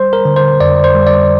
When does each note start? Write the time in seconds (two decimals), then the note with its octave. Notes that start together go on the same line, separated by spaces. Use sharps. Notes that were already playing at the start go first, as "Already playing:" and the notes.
Already playing: G3 C5
0.13 A#4
0.25 D3
0.36 C5
0.60 F2 D5
0.84 C5
0.95 G3
1.07 D5